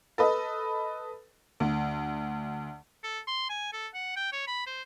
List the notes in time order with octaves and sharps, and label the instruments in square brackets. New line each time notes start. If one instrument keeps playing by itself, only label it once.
[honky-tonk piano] A4 B4 D#5
D2
[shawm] A4
C6
G#5
A4
F#5
G5
C#5
B5
C5